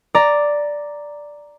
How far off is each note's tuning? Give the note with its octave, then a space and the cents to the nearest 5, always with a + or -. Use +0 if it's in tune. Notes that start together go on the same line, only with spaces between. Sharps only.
D5 +0 A#5 +0